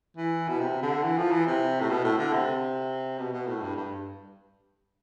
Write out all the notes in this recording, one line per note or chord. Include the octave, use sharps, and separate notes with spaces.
E3
B2
C3
D3
E3
F3
E3
C3
A2
B2
A2
D3
C3
B2
B2
A2
G2
G2